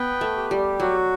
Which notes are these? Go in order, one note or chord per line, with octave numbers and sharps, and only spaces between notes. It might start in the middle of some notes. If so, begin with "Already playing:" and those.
Already playing: B3 B4 G5
A3
G4
G3
F#3 F#4